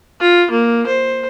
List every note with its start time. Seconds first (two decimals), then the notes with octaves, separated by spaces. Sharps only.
0.21 F4
0.51 A#3
0.87 C5